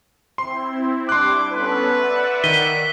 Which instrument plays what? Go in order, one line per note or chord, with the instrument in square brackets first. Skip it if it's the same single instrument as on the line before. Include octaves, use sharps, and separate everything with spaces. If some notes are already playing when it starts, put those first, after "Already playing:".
[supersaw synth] C4 E4 [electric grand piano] C6
[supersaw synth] G3 D4 E4 [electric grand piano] C6 F#6 [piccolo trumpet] D6
[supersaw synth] B3 C#4 A4 [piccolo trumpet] B4
[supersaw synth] D5 E5 F#5
[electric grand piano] D#3 [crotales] B6 D#7 G7